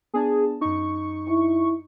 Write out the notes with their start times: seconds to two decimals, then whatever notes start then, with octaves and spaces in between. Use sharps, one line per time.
0.14 B3 D4 G#4 A5
0.61 F#2 D#4 C#6
1.29 E4